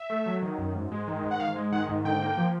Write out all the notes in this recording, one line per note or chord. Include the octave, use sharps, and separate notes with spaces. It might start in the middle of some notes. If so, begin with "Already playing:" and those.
Already playing: E5
A3
F#3
D#3
F#2
G#2
G#3
D#3
G#2
F#5
G#2 F5
G#3
D#3 F#5
G#2
D3 G5
A#3
F3